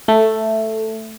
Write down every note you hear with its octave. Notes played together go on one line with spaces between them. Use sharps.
A3